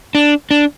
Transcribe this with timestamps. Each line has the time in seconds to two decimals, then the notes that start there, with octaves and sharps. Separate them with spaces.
0.15 D4
0.51 D4